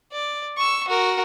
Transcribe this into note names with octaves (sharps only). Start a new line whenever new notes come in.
D5
C#6 E6
F#4 A#4